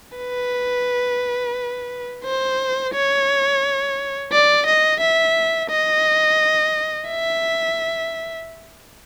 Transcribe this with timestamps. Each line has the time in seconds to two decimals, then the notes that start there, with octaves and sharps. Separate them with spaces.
0.17 B4
2.24 C5
2.94 C#5
4.32 D5
4.66 D#5
5.01 E5
5.70 D#5
7.08 E5